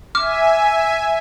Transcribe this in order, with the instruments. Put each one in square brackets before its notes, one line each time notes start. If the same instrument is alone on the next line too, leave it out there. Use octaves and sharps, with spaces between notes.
[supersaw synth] E5 G#5 [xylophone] D6 F6